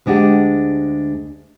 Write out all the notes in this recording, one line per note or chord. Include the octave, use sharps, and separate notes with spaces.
D2 G#3 D4 G4 F#5